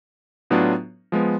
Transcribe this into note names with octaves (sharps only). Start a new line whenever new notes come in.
A2 F#3 B3 D4 F4
F3 G#3 B3